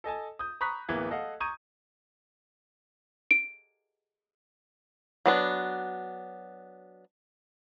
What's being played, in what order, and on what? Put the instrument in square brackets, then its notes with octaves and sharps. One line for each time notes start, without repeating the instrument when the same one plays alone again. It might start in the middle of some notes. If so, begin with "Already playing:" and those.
[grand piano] A4 D#5 G#5 A5
D#6 G6
A#5 B5 C#6 D#6 F#6 B6
D1 E3 A#3 B3 G#6
A4 D#5 F5 F#5
A#5 C#6 D#6 G6 G#6 D#7
[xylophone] D7
[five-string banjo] F#3 B3 D4